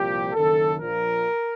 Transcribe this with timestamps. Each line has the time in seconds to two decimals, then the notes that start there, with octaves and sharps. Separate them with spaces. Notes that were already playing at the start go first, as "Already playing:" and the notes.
Already playing: C2 A#2 F3 G4
0.33 F#1 F#2 D#3 A4
0.79 A#1 A#2 F3 A#4